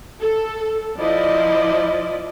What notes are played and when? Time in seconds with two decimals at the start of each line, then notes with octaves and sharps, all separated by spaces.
0.21 A4
0.98 F3 E4 D5 D#5